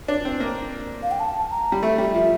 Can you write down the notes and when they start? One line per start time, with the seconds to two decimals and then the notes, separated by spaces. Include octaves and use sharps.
0.08 D4
0.25 C4
0.40 A#3
1.03 F5
1.11 G5
1.20 A5
1.51 A#5
1.72 G3
1.83 A3 E5
1.98 G3
2.15 F3